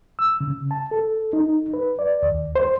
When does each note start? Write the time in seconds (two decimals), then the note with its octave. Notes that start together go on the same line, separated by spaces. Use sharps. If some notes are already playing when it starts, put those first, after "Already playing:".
0.19 E6
0.41 C#3
0.71 A5
0.91 A4
1.33 D#4
1.74 B4
1.99 D5
2.23 D#2
2.56 C5